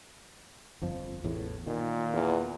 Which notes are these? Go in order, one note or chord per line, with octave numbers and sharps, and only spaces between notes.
G1 F2 F3
A1 E2 A2
A#2 D#3
E2